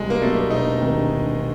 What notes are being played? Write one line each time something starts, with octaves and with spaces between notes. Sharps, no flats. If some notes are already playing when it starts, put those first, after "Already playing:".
Already playing: C2 G#3
A#3
B2 F#3 A3 B3 D4
A#3
E1 D#4
D2 C3 D#3